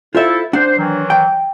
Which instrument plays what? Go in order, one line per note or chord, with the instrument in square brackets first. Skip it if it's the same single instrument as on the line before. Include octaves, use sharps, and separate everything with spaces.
[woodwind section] E4 A4 [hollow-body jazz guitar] F4 C5 E5
[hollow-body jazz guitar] D4 F#5 [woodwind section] C5
[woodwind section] D#3 E3 F#3
[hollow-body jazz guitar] G5